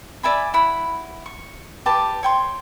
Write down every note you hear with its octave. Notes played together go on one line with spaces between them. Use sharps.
D5 E5 G#5 B5
E4 F#5 B5
C#6
G4 B4 A5 D6
C#5 G5 C6